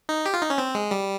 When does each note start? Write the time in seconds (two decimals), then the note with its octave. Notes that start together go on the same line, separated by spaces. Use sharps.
0.09 D#4
0.26 G4
0.34 F4
0.42 D#4
0.50 C#4
0.58 C4
0.75 G#3
0.91 G3